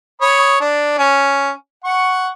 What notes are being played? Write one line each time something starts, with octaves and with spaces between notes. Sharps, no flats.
C#5 B5 D#6
D4
C#4
F#5 C#6